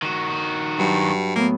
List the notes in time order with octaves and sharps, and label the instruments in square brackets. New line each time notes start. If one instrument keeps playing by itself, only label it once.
[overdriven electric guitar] D#3 F#4
[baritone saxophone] G2 [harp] F#3
[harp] A2 B3 [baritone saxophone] A#3